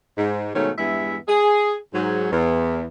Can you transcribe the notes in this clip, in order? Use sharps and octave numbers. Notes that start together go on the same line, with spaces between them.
G#2
G#2 B2 D#3 A3 C#4
E2 G2 G#3 B3 E4 E5
G#4
G#2 F#3
E2